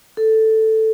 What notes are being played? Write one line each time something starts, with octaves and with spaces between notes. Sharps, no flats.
A4